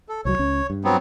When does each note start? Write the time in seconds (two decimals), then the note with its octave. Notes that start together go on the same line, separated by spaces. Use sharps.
0.09 A4
0.25 C2 F3 F#3 C#5
0.39 C#2 C#4
0.70 G2
0.84 F#3 B3 C4